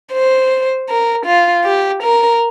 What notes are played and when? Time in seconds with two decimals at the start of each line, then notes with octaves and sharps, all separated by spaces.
0.13 C5
0.89 A#4
1.26 F4
1.65 G4
2.03 A#4